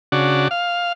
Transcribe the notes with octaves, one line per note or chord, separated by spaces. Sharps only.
C#3 D4 F#4
F5